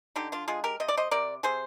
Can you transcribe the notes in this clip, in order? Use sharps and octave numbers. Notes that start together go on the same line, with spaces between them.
D3 D#4 G4
D4 F4
G#3 F4 G#4
G4 A#4
C3 D#5
D5
C5 D#5
C3 A#4 D5
C3 G#4 C5